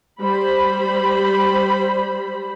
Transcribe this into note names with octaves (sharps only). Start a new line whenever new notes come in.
G3 C5 B5